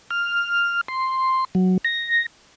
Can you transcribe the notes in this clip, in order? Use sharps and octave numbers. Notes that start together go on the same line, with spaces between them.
F6
C6
F#3
A#6